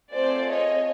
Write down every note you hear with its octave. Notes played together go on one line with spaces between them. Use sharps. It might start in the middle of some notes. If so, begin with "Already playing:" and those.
A3 C4 F4 G#4 C5 D5
C#5 D#5